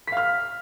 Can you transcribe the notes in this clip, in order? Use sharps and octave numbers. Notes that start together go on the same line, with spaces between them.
F5 F6 B6